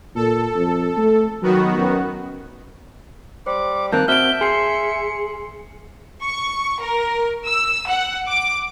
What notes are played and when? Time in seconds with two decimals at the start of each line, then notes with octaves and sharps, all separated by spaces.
0.15 A#2 A4
0.55 F2
0.97 A3
1.42 D#3 F#3 B3 F#4
1.77 F#2
3.46 G3 C5 D6
3.92 G2 D#3 A#3 C4 A5 F#6 G6
4.08 C4 F#4 E5 F6 G6 D7 G7
4.41 G#4 C6 C7 C#7
6.23 C#6
6.82 A#4
7.47 E6
7.89 F#5
8.28 D6